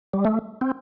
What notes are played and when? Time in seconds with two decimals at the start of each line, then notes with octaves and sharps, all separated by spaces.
0.13 G3
0.25 A3
0.61 C4